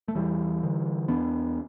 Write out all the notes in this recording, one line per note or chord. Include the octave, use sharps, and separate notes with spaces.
A3
E2 E3 G3
D3
E2 B3 D4